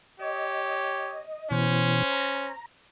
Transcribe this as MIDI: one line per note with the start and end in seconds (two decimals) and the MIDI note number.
0.20 1.24 67
0.20 1.24 73
0.20 1.49 75
1.51 2.03 47
1.51 2.03 52
1.51 2.54 61
1.51 2.54 72
2.11 2.66 82